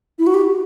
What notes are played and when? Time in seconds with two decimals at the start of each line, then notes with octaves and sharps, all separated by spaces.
0.19 E4
0.27 F#4
0.34 G4